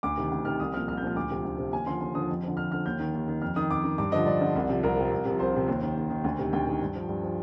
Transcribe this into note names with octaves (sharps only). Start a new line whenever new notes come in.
D2 D6
C3 D#3
D2
C3 D#3 F6
C2 D#6
A#2 F3 F6
C2 F6
G6
A#2 F3 F6
D2 D6
C3 F3
D2
C3 F3
D#2 G#5
D3 F3 C6
D#2 C6
D3 F3 D#6
F2
D3 F3
F2 F6
D3 F3 F6
D#2 G6
D#3
D#2
D#3
F2 F6
D#3 D#6
F2 D6
D#3
G2 D6
D3 F3 D#5
G2 D5
D3 F3
C2
C3 F3
C2 A#4
C3 F3
C2
C3 F3
C2 C5
C3 F3
D#2
D#3
D#2
D#3
D2
C3 D#3
D2 G5
C3 D#3
G2
F3
G2
F3